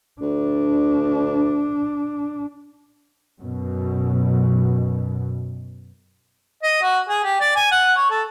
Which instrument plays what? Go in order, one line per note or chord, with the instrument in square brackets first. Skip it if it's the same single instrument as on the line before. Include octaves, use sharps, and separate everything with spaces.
[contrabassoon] D2 [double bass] D4
[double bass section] F#2 B2
[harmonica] D#5
F#4
G#4
G4
D5
G#5
F#5
C#5
A4